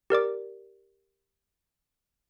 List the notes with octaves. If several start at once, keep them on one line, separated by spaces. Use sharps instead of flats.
G4 A#4 D5 D6